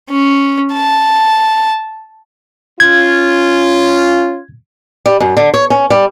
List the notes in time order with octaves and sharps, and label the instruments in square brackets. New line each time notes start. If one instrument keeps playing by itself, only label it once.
[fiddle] C#4
A5
[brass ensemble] C#4 F4 [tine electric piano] G#6
[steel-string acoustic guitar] G3
F#2
D3
C#5
C#4
G3